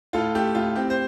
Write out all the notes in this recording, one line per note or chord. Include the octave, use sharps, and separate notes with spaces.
A2 F4 A4
A3 G4
A2 F4
C4 G4
C5